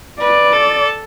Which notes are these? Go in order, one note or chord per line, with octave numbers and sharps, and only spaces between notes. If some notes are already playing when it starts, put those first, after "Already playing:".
B4 D5
A4